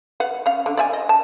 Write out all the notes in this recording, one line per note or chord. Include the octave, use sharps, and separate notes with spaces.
B4 F5 F#5
C#4 F5
D3
D5 E5 G#5
D#5
A5